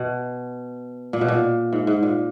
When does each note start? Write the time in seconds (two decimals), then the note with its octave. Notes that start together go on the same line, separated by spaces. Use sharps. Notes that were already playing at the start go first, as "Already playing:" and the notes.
Already playing: B2
1.13 A#2
1.21 B2
1.28 A#2
1.72 G#2
1.87 G#2
2.03 A#2